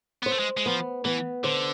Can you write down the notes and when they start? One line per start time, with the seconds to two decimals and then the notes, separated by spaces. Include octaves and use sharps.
0.23 B3
0.26 C5
0.32 A3
0.39 G#3
0.57 G#3
0.66 F3 B3
1.05 E3 B3
1.44 D3 C5